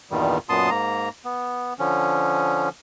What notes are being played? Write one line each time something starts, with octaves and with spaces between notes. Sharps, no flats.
E2 G2 A#2 D#3 G3
F#2 A#2 B3 A5 C6 D#6
G#2 A#3 A#5
B3
D3 F3 C#4